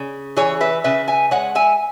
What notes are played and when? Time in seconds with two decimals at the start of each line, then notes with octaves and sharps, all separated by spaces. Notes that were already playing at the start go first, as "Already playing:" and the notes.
Already playing: C#3
0.36 E3 G#4 C#5
0.61 B4 E5
0.84 C#3 B4 E5
1.08 E5 G#5
1.31 G#3 C#5 F#5
1.55 E5 G#5